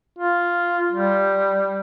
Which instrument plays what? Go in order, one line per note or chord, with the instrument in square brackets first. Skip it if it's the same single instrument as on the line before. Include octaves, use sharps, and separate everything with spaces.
[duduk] F4
G3